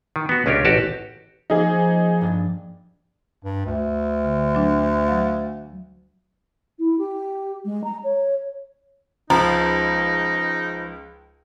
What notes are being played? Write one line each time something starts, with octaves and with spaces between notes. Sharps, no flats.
D#3
B3 F#4
C#2 C#4 D4 G4 A#4
A1 F#4 G4 A5
F3 A#3 D#4 G#4
G2 D4 A6
G2
D2
D3
F#3 D4
F#3 F5
E4
G4
G#3
A#5
C#5
C#2 F3 D#4 A#5